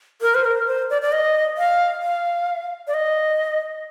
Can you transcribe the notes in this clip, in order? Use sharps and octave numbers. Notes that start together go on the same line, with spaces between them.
A#4
C5
A#4
C5
D5
D5
D#5
F5
F5
D5
D#5